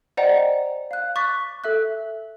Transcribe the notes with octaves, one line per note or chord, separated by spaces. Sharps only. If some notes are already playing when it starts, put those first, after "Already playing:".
C5 D5 D#5 F#5 G5 A#5
F5 F#6
C#6 D6 F#6 A6 B6
A4 E5 F#6